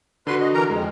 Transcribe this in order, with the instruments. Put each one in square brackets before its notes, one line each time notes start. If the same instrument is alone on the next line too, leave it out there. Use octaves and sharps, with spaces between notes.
[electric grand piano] D3 F#4 [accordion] B4 C6
[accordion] D#5
E3 A#4 A#5
[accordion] F2 [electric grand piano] G#3